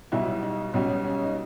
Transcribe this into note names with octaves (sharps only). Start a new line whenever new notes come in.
B1 B2 G3 E4
D#4
B1 B2 G3 C#4
C#4
D#4